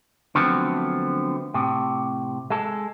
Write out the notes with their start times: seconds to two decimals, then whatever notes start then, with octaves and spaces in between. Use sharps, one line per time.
0.35 D3 F3 F#3 A3 B3 C4
1.54 A2 C3
2.50 G#3 A4